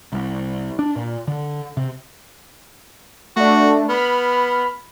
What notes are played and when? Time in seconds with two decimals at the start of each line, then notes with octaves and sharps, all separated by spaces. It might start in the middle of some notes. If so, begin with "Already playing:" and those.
0.13 C2
0.79 D4
0.96 A#2
1.27 D3
1.77 C3
3.36 A3 D4 F#4
3.89 B3 B5 F6